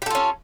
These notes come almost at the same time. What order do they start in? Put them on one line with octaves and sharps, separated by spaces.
G4 A4 F4 C#4